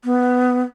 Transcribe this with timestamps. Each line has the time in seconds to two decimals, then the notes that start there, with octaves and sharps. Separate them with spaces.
0.04 B3